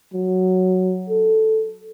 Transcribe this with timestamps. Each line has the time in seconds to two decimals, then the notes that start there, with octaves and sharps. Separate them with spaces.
0.13 F#3
1.09 A4